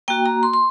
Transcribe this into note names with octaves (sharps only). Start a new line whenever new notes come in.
A#3 F#4 G5
A#5
C6
C6